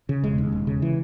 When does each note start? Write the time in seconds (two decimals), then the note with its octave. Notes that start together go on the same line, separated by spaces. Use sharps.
0.09 C#3
0.24 E1 G#3
0.38 D#2
0.52 E1
0.67 C#3
0.82 E3